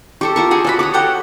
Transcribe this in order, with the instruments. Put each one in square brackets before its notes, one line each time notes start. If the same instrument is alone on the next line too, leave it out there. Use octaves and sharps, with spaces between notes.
[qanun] G4 A4 C5 [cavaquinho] C#6
[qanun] F4 C5 C#6 [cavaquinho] A#4
[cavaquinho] F#4 G#4
[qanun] F#4 A4 [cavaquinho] D5 F5 B5
[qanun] F#4 C#5 [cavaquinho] D6 D#6
[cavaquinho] G4 A4 F#5